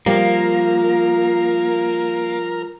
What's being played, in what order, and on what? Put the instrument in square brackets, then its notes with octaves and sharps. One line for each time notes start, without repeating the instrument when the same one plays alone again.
[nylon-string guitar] F3 [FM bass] G3 [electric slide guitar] A#3 [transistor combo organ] A#4